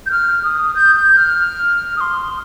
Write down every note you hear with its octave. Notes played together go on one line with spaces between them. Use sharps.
G6
F6
D#6
G6
G6
F6
D#6
C6